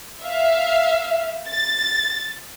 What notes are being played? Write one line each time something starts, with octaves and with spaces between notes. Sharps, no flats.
E5 F5
A6